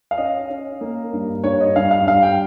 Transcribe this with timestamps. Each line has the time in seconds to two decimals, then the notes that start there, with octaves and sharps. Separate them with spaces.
0.11 F5
0.18 C#4 D#5
0.50 C#4
0.81 A#3
1.13 G2
1.44 G2 C#5
1.61 D#5
1.76 G2 F5
1.91 F5
2.07 G2 F5
2.23 G5